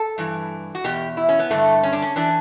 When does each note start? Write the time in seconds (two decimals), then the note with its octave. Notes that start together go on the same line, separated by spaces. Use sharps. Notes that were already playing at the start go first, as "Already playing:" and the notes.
Already playing: A4
0.18 G2 E3
0.75 F#4
0.84 E2 B2 G4
1.17 E4
1.29 C#4
1.39 B3
1.50 G2 D3 A3
1.83 C#4
1.92 D4
2.02 C#4
2.16 E3 D4